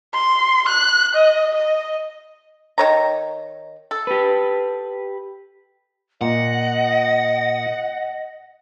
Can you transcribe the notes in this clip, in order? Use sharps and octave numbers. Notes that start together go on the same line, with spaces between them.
C6
F#6
D#5
D#5
D#3 C#5 A#5
A4
G4 B4
A#2 D#5 F#5